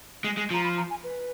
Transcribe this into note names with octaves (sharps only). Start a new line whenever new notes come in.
G#3
G#3
F3 A#5
B5
A#5
G#5
B4